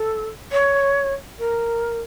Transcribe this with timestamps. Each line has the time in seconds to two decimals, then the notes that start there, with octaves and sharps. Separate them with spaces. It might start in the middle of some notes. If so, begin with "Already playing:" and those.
Already playing: A4
0.52 C#5
1.39 A#4